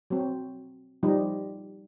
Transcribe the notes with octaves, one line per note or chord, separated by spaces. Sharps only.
F#3 C4
F3 G3 D#4